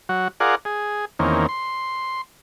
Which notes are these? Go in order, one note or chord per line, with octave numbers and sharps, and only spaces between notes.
F#3 F#4
F4 G#4 A#4 D5 F#5
G#4
E2 D#3 A#3 C4 C#4
C6